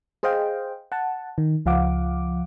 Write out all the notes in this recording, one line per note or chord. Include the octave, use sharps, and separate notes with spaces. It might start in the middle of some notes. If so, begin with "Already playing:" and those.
G#4 C5 D#5 F5 G5
F#5 A5
D#3
C#2 F3 F5 F#5 D6